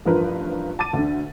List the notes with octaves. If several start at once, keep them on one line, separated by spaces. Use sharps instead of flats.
A1 G2 F3 F4 A#4 B4
A5 D6 A6 D#7
D2 D3